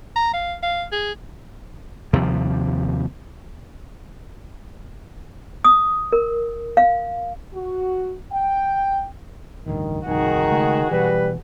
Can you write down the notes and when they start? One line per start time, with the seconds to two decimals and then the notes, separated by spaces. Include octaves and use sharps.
0.16 A#5
0.33 F5
0.63 F5
0.92 G#4
2.13 D#2 C3 F3 G3
5.64 D#6
6.13 A#4
6.77 F5
7.54 F#4
8.32 G5
9.66 A1 D2 G2 D#3
10.07 G1 C2 F2 D#3 D#4 F#4 G#4
10.51 C#3 G#3 A3
10.91 B2 E3 G3 B4